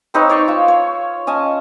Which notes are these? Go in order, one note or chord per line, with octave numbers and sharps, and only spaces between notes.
C4 D#4 B4 C#5
C#5 D5 C6 C#6
F4 E6
C#5
C#4 D#5 G#5 A5